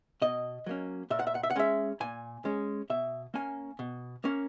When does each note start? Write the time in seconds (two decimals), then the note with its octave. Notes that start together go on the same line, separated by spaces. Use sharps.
0.22 B2 D#5
0.66 F#3 A#3 C#4
1.10 A#2 E5
1.19 F#5
1.27 E5
1.35 F#5
1.43 E5
1.51 F#5
1.56 G#3 C#4 E5
2.00 A#2 G#5
2.45 G#3 C#4
2.90 B2 E5
3.34 A#3 C#4 G#5
3.79 B2
4.24 A#3 C#4